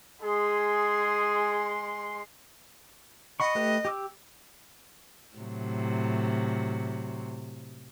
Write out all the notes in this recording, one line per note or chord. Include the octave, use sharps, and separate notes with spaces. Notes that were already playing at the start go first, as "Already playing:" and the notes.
G#3 G#4 C6
D#5 F#5 B5 C#6
A3 G4 B4
G4 D6 E6
A2 C3 F#3